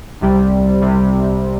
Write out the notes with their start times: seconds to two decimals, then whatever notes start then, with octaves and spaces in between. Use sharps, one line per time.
0.21 C2 C3 G3
0.81 C3 G3